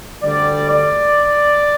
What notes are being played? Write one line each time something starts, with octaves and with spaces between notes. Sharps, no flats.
D2 D3 G3 D5
D5